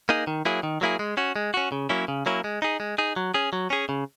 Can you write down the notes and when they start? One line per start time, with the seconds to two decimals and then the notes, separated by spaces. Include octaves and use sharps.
0.09 A#3 D#4 G#4
0.27 D#3
0.45 F#3 A#3 E4 G#4
0.63 D#3
0.81 F#3 A#3 E4 G#4
0.99 G#3
1.17 C#4 F#4
1.36 G#3
1.54 C#4 F#4
1.72 C#3
1.89 F#3 A#3 C#4 E4
2.08 C#3
2.26 F#3 A#3 C#4 E4
2.44 G#3
2.62 D#4 G#4
2.80 G#3
2.98 D#4 G#4
3.16 F#3
3.34 C#4 G#4
3.53 F#3
3.70 C#4 G#4
3.89 C#3